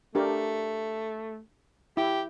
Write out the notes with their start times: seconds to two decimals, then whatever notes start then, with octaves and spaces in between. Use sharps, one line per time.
0.15 A3 D4 G4 A#4
1.97 E4 G4